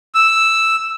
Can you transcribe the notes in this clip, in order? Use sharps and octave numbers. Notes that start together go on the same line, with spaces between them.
E6